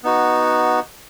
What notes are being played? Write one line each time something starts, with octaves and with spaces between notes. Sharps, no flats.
B3 D#4 F#4